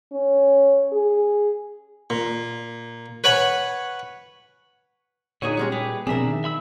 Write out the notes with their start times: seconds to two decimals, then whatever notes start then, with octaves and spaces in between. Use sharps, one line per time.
0.13 C#4
0.92 G#4
2.10 A#2
3.24 B4 C#5 F#5 G#5 B5
5.42 A#2 D3 D#4 F#4 G#4 C#5
5.57 G3 G#3 C#4 C#5
5.72 G4 G#4 B4
6.07 B2 F3 C4 D4 G#4 A#4 E5
6.26 D#3
6.44 E5 B5 E6